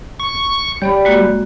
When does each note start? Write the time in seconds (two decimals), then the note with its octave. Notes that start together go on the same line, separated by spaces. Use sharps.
0.20 C#6
0.82 G3 C#5 D5 B5
1.05 G#3 A#3 F#4